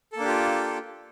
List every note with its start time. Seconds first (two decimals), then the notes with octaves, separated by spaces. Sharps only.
0.13 A4
0.16 A#3
0.20 D4
0.24 G4
0.28 F4